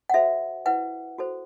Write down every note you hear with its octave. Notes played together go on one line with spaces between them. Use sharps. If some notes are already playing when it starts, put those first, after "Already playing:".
F#5
F#4 A4 C5 E5
E4 B4 F#5
F#4 A4 C5